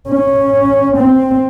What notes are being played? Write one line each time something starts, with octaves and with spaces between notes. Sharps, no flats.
C#4
C4